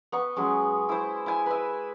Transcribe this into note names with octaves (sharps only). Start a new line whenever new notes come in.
B3 C#6
F#3 G#3 C#4
E4 C5
E4 G#5
B4 E5